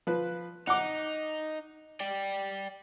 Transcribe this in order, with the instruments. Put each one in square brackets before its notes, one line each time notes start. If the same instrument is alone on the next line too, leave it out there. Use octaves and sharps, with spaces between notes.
[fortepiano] F3 B4
[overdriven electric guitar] D#4 [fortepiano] F#5 D6
[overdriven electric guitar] D5 G5